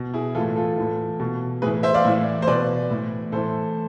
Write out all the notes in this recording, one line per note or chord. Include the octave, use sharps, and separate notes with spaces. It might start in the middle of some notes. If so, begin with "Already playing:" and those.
Already playing: B2
E4 G#4
E3 F4 A4
A2
F4 A4
A2 E3
B2
A2 E3 G#4 B4
C5 E5
D5 F5
A2 E3
C5
B2 B4 D5
A2 E3
A2 E3 A4 C5